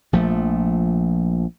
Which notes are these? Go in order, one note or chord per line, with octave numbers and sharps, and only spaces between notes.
A#1 F3 A3